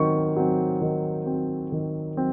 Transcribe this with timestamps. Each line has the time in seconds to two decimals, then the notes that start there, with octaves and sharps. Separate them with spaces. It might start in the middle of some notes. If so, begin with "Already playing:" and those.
Already playing: D#3 F#3 C4 C#6
0.36 F#3 C4
0.81 D#3
1.26 F#3 C4
1.72 D#3
2.17 F#3 C4